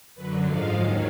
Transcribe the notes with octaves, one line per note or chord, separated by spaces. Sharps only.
F#2 D3 F#3 B4
G#2 F3 G#3 F5
D#2 D#3 F#3